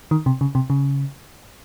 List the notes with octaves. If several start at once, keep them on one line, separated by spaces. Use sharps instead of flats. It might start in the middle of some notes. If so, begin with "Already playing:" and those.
D#3
C3
C#3
C3
C#3